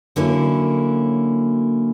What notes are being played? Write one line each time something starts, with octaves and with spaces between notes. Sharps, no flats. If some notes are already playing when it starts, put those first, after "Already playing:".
D3 F#3 A#3 C#4 E4